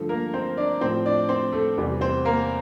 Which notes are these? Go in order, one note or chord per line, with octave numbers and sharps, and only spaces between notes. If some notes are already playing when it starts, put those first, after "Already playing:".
Already playing: G2 D3 F3 A3 A4
A#3 A#4
C4 C5
D4 D5
A2 F3 A3 C4 C5
D4 D5
C4 C5
A3 A4
E2 C3 G3 C4
C4 C5
A#3 A#4